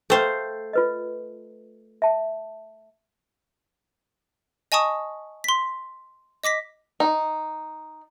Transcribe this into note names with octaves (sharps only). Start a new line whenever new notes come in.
A3 A4 C5 F5 G5
F4 B4 D#5
E5 A5
D#5 G#5 A5 C#6 D#6
C6 B6
D#5 D6 A#6 B6
D#4